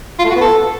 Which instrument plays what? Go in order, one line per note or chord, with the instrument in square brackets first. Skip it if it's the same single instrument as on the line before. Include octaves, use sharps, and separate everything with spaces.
[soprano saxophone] F4
A3
F#4
B3
A4